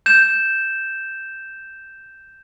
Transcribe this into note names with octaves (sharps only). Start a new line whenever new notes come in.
G6 E7